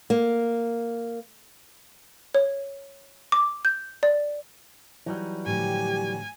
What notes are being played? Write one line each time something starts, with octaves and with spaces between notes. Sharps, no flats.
A#3
C#5
D6
G6
D5
E3 F#3 G3 D#4
A2 D3 F3 G4 G#5